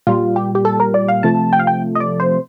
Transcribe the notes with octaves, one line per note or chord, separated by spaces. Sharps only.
A#2 G3 F4
G4
G4
A4
A#4
D5
F5
C3 F3 A3 A5
G5
F5
G5
D#5
D5
C5